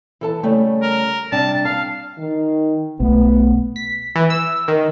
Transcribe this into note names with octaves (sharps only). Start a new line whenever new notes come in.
E3 A4 A5
C#3 G3 A3
A#4
C3 G3 D4 A5
F5 A5
D#3
B1 A3 B3
B6
E3
E6
D#3